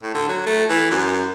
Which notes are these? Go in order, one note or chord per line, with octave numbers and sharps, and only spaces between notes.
A2
D3
F#3
A3
E3
F#2